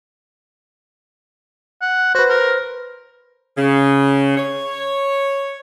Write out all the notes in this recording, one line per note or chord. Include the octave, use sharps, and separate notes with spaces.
F#5
F#4 B4 C5
A#4
C#3
C#5